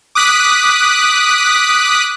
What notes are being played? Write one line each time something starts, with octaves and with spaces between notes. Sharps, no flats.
D6 D#6 F#6 B6